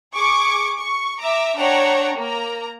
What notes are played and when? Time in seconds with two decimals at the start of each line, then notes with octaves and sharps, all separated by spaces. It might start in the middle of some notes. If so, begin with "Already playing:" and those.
0.15 G#4 C#6 D6
0.79 C#6
1.19 E5 A#5 D6
1.58 D4 C#5 F#5 G5 A5 A#5
2.17 A#3 A#5